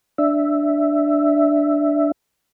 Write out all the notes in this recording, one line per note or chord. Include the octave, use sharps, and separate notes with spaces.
D4 E5